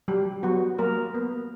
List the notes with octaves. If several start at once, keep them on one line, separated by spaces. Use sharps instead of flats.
F#3 G3 G4
F#3 B3 F#4
F#3 A#3 A#4
B3